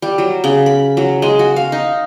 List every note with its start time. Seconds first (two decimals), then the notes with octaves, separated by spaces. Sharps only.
0.02 G3
0.18 F#3
0.44 C#3
0.66 B5
0.97 F#3
1.22 G#3
1.39 F#4
1.56 F5
1.72 D#4